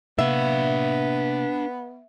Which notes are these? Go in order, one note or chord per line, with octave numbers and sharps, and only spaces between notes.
C3 A#3 B3 D4 E5 F5